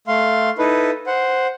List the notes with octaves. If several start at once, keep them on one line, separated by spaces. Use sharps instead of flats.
A3 F5 C6
D#4 E4 A4 B4
C5 F#5